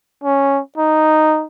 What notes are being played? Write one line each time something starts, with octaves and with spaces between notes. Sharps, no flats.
C#4
D#4